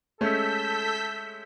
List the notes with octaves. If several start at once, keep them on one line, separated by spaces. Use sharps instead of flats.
G#3 A3 C#4 A4 E6 G6 B6